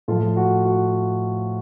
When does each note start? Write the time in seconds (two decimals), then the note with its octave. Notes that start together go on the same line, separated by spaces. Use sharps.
0.08 A2 F3 F4 A4
0.37 F#4
0.65 F#4